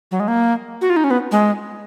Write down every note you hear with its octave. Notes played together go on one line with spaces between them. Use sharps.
F#3
G#3
A#3
F#4
F4
D#4
C#4
B3
G#3